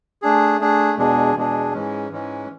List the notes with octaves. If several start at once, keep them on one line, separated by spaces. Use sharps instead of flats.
A3 D4 G#4
A3 D4 G#4
E2 B2 G#3 D4 G#4
E2 B2 G#3 D4 G#4
G#2 E3 G#3 C#4
G#2 E3 G#3 C#4